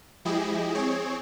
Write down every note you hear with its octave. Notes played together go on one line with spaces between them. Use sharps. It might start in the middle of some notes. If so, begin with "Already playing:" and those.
F3 G#3 E4 G4 G#4 D#5
C4 G#4 C#5